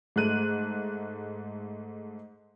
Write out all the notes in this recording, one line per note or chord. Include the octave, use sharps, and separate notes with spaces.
G#2 A3 F#6 D#7